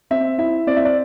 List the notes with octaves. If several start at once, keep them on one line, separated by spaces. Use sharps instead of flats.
C4 E5
E4 E5
C4 D5
E5
D5